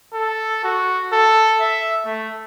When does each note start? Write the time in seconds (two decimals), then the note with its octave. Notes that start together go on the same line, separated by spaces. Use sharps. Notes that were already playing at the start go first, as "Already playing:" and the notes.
0.13 A4
0.64 F#4
1.13 A4
1.61 E5
2.05 A3